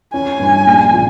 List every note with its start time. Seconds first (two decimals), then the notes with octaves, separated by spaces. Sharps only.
0.14 C#4 G#5
0.39 G2
0.66 A#1
0.94 A#2